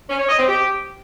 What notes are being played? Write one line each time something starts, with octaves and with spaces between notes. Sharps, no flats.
C#4
C#5
D#5
C4
G4